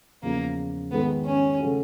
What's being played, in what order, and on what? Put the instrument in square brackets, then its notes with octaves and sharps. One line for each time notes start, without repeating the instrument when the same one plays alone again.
[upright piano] E2 C#3 F3 [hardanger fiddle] A#3
[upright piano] G#2 D#3 G#3 [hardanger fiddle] B3
[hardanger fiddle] C#4
[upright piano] C#3 F#3 A3 C#4 F#4